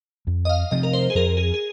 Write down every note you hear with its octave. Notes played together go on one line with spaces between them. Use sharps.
F2
D#5
F5
C3 F3 C4 D#5
A#4
C5
G#4
F2 A#4
G#4
G#4